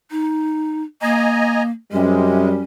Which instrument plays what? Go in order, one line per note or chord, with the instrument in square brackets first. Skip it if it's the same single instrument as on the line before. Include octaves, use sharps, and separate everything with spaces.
[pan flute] D#4
[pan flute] A#3 [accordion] D#5 G#5 A#5
[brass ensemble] F#2 G3 [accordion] C3 G#3 [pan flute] C#4